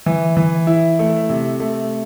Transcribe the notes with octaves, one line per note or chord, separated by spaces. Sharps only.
E3
E3
E4
A3
C3
A3